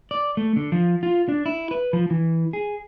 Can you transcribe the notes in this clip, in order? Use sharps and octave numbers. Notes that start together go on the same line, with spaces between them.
D5
A3
D3
F3
F4
D4
E4
B4
F3
E3
G#4